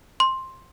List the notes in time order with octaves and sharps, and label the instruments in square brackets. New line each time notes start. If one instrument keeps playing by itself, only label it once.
[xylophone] C6